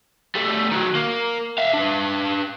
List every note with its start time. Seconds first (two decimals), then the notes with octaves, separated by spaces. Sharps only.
0.35 G3 A3
0.71 D#3 F#3
0.95 A#3
1.58 E5 F5
1.74 D4 B4